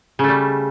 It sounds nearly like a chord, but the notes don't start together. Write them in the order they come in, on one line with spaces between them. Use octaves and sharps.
C#3 A3 G3